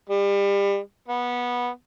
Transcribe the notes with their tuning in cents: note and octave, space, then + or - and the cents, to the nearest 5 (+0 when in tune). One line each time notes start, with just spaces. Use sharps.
G3 +30
B3 -15